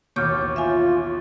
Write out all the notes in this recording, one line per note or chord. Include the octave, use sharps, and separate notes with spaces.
A1 D#2 B2 C#5 C#6 D6 F6 G6
F4 E5 F5 G#5